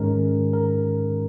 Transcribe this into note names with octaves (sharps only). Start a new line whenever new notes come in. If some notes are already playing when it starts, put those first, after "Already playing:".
Already playing: G#2 D#3 G#3 C#4 A#4
A#4